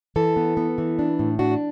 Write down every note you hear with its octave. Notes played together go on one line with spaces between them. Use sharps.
E3 A4
B3
B3
E3
D4
A2
D4 F#4